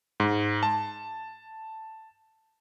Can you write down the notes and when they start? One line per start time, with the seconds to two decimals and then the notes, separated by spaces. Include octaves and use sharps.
0.20 G#2
0.63 A5